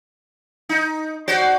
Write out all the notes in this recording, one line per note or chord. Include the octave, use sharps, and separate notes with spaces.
D#4
F#4 C5 D5